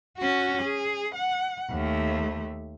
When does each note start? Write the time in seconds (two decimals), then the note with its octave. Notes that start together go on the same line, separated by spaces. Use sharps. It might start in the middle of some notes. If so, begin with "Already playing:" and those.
0.18 C#4 F#4
0.62 G#4
1.15 F#5
1.70 D#2 A3